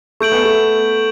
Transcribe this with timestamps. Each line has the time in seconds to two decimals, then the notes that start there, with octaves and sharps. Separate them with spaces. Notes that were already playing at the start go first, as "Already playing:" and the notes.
0.20 A3 C#6 G6 D7 F#7
0.32 B3
0.44 A3